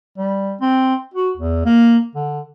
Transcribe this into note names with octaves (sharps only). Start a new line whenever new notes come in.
G3
C4
F#4
E2
A#3
D3